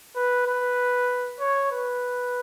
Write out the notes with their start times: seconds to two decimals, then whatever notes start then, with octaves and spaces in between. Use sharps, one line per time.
0.16 B4
0.47 B4
1.40 C#5
1.72 B4